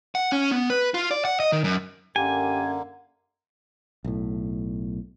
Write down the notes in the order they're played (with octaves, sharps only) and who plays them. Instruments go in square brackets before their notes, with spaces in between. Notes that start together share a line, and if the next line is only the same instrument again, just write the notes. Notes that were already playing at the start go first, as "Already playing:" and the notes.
[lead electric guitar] F#5
C#4
B3
B4
F4
D5
F#5
D#5
D#3
F#2
[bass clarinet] F#2 [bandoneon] D3 A#3 [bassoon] G4 [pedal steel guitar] G#5
[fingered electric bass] B1 A2